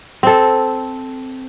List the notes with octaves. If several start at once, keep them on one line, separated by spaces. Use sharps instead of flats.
C4 A4